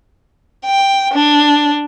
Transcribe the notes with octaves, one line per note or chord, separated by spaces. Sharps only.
G5
D4